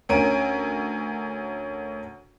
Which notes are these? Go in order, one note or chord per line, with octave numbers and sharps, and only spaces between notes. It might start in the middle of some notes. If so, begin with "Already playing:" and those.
D2 C#4 A#4 D7 D#7